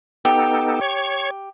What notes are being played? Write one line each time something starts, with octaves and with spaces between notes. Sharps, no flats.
B3 D#4 G4 A4
C#5 C#6